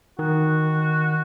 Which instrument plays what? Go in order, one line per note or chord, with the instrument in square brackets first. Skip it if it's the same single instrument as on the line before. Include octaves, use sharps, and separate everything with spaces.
[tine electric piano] D#3 [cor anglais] F#4